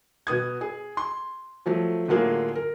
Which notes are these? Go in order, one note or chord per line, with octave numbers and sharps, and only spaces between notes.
B2 B3 D#6 G#6
G#4
C6
F3 F#3 A3
A2 D3 F#3 A#3 F4 G#4
A#4